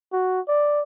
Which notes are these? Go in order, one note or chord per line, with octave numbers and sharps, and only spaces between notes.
F#4
D5